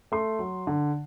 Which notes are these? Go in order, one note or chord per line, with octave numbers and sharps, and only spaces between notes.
A3 C6
F#3
D3